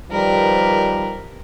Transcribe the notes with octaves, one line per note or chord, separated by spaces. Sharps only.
D#3 F3 G3 A#4 B4